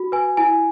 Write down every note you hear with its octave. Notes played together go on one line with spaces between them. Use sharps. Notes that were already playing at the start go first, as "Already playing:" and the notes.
Already playing: F#4
B4 G#5
E4 G#5